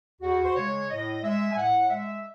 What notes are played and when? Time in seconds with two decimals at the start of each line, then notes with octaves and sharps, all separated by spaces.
0.21 E2 F#4
0.45 C5
0.55 C#3 G#3 C#5
0.90 A2 D#5
1.23 G#3 E5
1.52 G#5
1.56 A2 F#5
1.90 G#3 E5